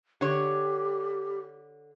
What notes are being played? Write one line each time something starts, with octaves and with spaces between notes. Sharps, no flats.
D3 G4 C#5